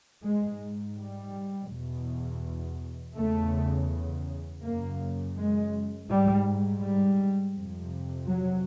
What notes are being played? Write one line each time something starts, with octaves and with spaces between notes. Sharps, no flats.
G#2 G#3
G3
E2 B2
E2 C#3 A3
F#2 C#3 A#3
G#3
G#2 G3
G3
F2 C3
F#3